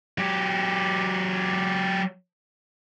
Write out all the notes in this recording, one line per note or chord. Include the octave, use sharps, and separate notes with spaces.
F#3 G4